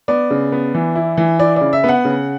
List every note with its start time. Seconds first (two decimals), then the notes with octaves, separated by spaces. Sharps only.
0.08 B3 D5
0.31 C#3
0.52 B3
0.74 E3
0.95 E4
1.17 E3
1.39 E4 D5
1.56 C#3 D5
1.73 E5
1.84 B3 F#5
2.05 C#3